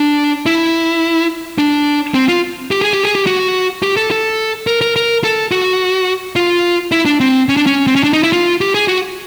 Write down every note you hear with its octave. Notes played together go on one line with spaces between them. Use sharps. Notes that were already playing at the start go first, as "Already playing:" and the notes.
Already playing: D4
E4
D4
C4
F4
G4
G#4
G4
G#4
G4
F#4
G4
A4
A4
A#4
A#4
A#4
A4
F#4
F4
E4
D4
C4
C#4
D4
C#4
C4
C#4
D4
D#4
E4
F4
G4
G#4
F#4